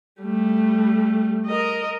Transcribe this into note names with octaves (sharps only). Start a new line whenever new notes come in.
G3 A3
A#4 D#5